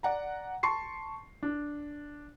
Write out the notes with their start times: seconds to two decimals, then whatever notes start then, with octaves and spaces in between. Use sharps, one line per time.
0.03 D5 F#5 A#5
0.63 A5 C6 C#6 C7
1.43 D4